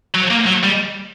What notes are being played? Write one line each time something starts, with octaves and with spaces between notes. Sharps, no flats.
F#3
A#3
F#3
G3